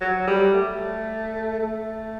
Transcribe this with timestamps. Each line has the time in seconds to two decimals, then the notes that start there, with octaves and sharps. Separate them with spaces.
0.01 F#3
0.27 G3
0.54 A3
1.59 A3